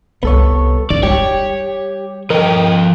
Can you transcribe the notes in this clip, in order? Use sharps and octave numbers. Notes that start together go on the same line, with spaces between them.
C2 B3 A4 C#5
C#3 D5
G3 G4 C#5
F3 A#4 D#5 G5